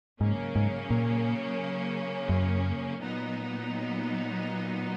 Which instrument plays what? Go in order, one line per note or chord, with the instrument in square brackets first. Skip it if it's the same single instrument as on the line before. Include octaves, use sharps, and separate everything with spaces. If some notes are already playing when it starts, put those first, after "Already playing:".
[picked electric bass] G#2 [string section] C#3 F#3 A#3 C#4
[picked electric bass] G#2
A#2
F#2
[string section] A#2 F#3 B3 D#4